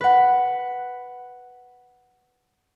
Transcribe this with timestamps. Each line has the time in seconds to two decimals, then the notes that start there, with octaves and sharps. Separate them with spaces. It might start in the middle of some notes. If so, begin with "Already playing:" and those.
0.01 B4 F#5